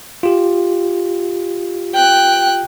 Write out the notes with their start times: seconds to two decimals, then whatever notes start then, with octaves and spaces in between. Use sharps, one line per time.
0.23 F4 G4
1.94 G5 F#6